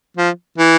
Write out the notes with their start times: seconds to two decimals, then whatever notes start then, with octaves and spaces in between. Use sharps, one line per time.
0.17 F3
0.58 E3